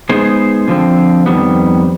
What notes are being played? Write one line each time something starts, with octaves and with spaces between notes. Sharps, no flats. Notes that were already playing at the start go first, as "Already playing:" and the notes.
G#3 B3 D#4 G#4 C5
D3 F3 C4
F2 D#3 G3 B3